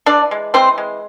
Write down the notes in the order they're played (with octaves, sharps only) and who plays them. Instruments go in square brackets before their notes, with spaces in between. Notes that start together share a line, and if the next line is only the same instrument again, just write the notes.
[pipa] E3 D4 D5
G#3
E3 C4 C5
G#3